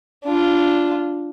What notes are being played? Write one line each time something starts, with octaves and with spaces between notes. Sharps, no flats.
D4 F4